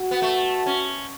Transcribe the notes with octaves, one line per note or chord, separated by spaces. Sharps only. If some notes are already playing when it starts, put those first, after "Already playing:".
Already playing: F#4
B3
A3
C#4